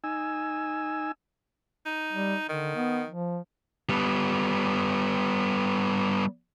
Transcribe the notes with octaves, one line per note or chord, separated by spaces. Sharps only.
D#4 G#5 E6
D#4
G3
D3 D#3
B3
F3
G3 B3